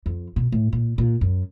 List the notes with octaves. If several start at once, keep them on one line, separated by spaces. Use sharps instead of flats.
F2
B2
A2
A#2
A#2
F#2